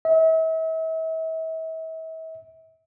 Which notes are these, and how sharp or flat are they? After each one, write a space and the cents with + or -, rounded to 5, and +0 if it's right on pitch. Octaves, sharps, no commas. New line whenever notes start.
E5 -40